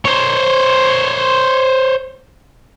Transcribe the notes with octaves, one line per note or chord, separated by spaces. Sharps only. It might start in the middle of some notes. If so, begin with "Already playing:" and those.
C5 C#5